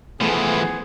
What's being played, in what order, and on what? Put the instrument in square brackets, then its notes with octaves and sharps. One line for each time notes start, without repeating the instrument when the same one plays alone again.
[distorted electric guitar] E3 F3 [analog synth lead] A3 [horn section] B3 G#4